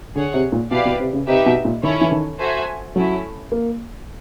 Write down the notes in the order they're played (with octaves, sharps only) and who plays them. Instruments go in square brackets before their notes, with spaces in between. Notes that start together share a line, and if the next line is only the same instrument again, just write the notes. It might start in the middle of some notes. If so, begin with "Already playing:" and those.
[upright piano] D3 [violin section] G#4 C#5 F#5
[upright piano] C3
A#2
[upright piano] B2 [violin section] E4 G4 B4 D5 F5
[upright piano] B2
C3
C#3
[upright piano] C3 [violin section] D#4 G4 B4 E5
[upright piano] B2
A#2
[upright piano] D#3 [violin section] C#4 E4 A4 C#5
[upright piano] E3
D#3
[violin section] F#4 A4 C5 E5 G#5
[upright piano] F#3 [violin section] A3 C#4 E4
[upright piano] A#3